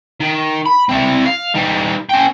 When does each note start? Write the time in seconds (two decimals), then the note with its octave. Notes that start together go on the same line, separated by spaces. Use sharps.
0.20 D#3
0.66 B5
0.89 C4 E4
1.26 F5
1.55 G3 D#4
2.09 C#4 G5